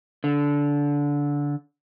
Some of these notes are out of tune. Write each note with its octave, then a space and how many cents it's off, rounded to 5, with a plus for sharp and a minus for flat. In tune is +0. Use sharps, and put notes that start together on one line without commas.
D3 -20